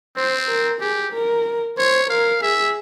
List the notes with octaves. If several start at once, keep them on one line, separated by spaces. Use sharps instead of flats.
C4 C5
A#4
G4 G#4
A#4
C5 C#5
A#4 F5
G#4 E5